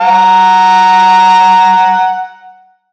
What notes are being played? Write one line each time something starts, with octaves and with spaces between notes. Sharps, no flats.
F#5 A#5